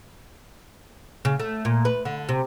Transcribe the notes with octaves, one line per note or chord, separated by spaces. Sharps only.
C#3
A3
A#2
B4
D3
C3